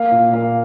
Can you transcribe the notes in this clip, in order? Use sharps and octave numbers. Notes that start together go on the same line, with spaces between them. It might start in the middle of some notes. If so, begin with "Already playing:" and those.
Already playing: A#3 F5
A#2
A#3 F5